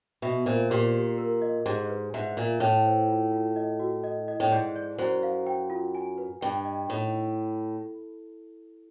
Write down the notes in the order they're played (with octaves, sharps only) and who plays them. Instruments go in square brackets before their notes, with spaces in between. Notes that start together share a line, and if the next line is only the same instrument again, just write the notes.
[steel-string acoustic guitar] B2 [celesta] E5
[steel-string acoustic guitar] A#2 [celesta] C5
[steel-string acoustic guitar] A#2 [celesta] G4
[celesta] G4
A#4
D#5
[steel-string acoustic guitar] G#2 [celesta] G4
[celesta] B4
[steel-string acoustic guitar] G#2 [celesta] E5
[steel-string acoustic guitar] A#2 [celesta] E5
[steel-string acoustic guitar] A2 [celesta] A5
[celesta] C5
F4
F4
D#5
F#4
D#5
D#5
[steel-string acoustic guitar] A2
[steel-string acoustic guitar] G#2 [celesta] D5
[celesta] D5
[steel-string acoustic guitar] F#2 [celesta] C5
[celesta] F5
G5
F4
G#5
B4
[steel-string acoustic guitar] G2 [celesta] G5
[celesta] D#5
[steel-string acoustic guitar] A2 [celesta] D#4